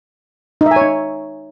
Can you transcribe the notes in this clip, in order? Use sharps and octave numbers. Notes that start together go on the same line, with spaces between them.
D#4
E5
G#5
C#5
D#4